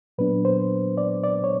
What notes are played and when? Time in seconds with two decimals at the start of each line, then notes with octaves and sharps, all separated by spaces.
0.18 A#2 F#3 B3 D4 B4
0.45 C5
0.98 D5
1.24 D5
1.44 C#5